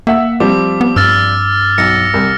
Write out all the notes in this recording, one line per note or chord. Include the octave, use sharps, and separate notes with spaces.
A#3 E5 F#5 E6
F3 G3 C4 D6
B3
G2 E6 F6 A6
B1 E6 A#6 C#7
C2